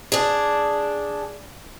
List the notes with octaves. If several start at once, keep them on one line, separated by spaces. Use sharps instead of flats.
D4 G#4